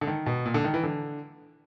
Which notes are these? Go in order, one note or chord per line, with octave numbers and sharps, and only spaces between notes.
D3
D#3
B2
A#2
D3
D#3
E3
D3